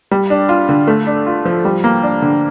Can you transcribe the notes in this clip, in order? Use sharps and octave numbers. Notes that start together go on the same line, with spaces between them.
G3
D4
F4
D3
A3
D4
F4
F3
G3
A#3
D4
D3